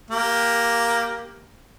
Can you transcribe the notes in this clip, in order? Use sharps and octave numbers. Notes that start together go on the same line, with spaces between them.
A#3 G4